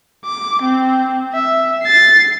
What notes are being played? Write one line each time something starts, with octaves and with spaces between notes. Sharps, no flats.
D6
C4
E5
A6 C7